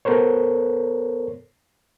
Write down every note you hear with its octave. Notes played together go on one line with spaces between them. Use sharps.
B3 A4 A#4 C5 C#5